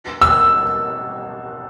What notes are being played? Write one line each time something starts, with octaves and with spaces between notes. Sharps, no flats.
E6